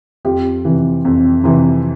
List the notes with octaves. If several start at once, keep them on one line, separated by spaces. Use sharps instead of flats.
F2 F4 G4
C3 E3
F2
C3 E3